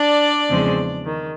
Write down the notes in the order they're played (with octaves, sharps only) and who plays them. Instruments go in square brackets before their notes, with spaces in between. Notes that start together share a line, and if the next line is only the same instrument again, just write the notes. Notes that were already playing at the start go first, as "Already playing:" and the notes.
Already playing: [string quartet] D4 D5
E2 C#3 F3 G#3 C4
D#3